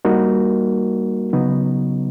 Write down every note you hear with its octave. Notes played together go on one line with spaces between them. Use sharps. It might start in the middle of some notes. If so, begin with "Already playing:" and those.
G3 A#3 D#4 F#4 A#4
C#3 F#3 B3 D#4